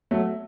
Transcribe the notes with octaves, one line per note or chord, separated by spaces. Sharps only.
F#3 A3